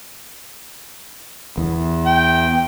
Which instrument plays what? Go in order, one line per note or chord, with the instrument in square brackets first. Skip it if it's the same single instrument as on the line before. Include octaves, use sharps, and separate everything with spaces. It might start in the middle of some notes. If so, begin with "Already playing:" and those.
[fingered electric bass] E2
[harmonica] G5